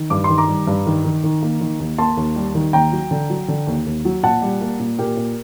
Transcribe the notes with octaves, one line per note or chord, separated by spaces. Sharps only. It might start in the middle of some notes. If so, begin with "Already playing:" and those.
Already playing: D#3
G2 D6
C6
D#3
A#5 D6
G3
G2
D#3
D#3
D#3
A#3
D#3
D#2
A#3 A5 C6
D#2
G3
D#3
D#2 G5 A#5
F#3
D3
F#3
D3
D#2
D#2
F#3
A#2 F#5 A5
G3
A#3
A#2
A#2 G4 A#4
A#2